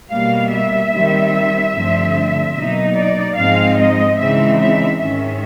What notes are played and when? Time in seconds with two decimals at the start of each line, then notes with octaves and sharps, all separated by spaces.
0.11 B2 G3 A#3 F5
0.52 E5
0.92 D#3 G3 C4
1.73 G2 D3 F3 A3 C4
2.55 B2 F#3 A#3 D#4 D#5
2.95 D5
3.36 G#2 F3 G#3 C4 D#4 F5
3.77 D#5
4.18 C#3 E3 G#3 C4 D#4 E5
4.58 E5
4.99 G#2 D#3 G#3 C#4 E5